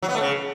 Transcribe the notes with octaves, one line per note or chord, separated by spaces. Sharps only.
F#3
B3
A3
C#3